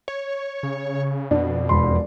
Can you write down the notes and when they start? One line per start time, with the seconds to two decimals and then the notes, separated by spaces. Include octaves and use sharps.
0.08 C#5
0.63 C#3
1.31 F2 B2 D4
1.69 E1 B5 C6